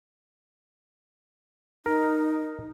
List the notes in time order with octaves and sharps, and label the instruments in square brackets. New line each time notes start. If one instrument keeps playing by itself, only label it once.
[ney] D#4 [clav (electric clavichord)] A#4